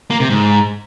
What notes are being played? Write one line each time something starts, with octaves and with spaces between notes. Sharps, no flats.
A#3
C3
G#2